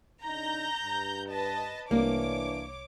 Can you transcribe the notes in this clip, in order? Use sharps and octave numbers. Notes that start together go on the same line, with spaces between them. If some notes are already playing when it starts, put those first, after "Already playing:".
C#3 D4 D#4 A#5 G6
G2
B4 D#5 A5
C2 E3 A#3 D4 C#5 D6